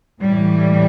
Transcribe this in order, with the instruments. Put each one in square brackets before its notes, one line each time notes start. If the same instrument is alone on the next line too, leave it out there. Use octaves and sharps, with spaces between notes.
[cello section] A2 E3 G3